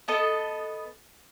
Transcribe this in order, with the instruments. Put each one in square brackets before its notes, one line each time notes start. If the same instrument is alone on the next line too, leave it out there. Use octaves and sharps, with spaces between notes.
[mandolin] B3 A4 D#5